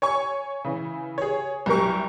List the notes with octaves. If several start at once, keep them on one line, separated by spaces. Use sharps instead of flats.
C#5 G#5 C#6
C#3 E3
G#4 C#5
C2 F#2 G4 A#4 C#6